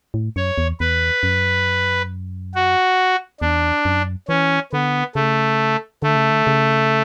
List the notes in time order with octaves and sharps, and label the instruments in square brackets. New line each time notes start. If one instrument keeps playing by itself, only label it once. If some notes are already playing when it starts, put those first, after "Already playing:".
[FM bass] A2
[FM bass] F#2 [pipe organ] C#5
[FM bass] E2
[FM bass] E2 [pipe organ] B4
[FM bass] F#2
[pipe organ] F#4
[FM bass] E2 [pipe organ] D4
[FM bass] F#2
[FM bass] E3 [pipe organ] C#4
[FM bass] D3 [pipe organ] B3
[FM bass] C#3 [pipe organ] A3
[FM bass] D3 [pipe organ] A3
[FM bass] C#3
D3
C#3